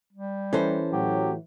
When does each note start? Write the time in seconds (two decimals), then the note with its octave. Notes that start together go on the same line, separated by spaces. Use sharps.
0.13 G3
0.53 E3 C#4 A4 C5
0.92 A2 F#3 G4